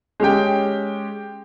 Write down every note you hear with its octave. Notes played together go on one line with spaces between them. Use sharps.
G#3 C#4 G4 G5